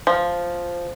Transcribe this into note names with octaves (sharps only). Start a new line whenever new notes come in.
F3